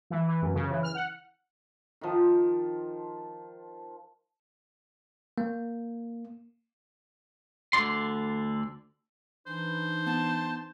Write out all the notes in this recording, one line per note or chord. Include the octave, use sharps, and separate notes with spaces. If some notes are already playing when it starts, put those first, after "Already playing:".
E3
E3
F#2
C#3
E3
F6
F#5
D#3 F3
A#3
D2 D3 D5 C6
E3 D4 D#4 C5
B3 A5